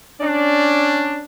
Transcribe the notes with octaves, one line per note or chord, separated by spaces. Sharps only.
C#4 D4